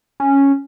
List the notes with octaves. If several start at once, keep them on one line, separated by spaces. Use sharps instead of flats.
C#4